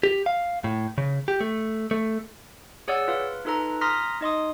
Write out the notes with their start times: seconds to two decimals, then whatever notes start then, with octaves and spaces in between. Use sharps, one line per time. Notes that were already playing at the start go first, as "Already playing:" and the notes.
0.03 G4
0.26 F5
0.64 A2
0.98 C#3
1.28 G4
1.41 A3
1.91 A3
2.88 G#4 C#5 D5 F#5 E6
3.08 F4 B4 F5
3.45 D#4 F4 A4 B4 A#5
3.81 A#5 C6 D#6 F6 A#6 B6
4.21 D#4 D#5 C6 D#6